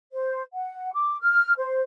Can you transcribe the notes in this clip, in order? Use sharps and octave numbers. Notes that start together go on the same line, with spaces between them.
C5
F#5
D6
F6
C5